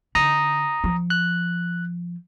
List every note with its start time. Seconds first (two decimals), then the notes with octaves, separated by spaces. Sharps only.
0.15 D3 A#5 D#6
0.84 F3
1.10 F#6